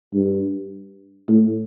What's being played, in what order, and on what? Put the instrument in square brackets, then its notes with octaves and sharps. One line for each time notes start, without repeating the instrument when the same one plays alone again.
[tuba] G2
A2